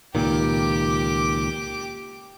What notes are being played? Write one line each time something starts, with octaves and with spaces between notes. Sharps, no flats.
C#2 A#2 D#3 G4 D6